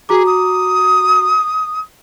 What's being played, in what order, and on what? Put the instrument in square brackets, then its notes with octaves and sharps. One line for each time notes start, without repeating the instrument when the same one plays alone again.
[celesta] F#4 A#5 D6 [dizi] G#4
[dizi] D#6